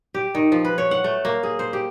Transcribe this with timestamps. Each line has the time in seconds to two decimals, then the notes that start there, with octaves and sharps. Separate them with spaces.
0.14 G4
0.35 D#3
0.52 F3
0.65 B4
0.78 C#5
0.91 F#5
1.04 A3
1.25 A#3
1.43 G#4
1.59 C5
1.73 G4